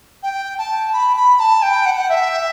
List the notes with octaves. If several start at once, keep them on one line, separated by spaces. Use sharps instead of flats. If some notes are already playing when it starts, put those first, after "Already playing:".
G5
A5
B5
B5
A5
G5
F#5
E5